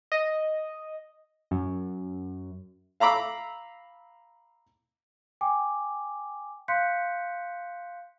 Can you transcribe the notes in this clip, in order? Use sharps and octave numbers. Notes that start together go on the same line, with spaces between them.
D#5
F#2
F5 A#5 B5 D6 E6
G5 G#5 D6
F5 C6 F#6 G6 B6 C#7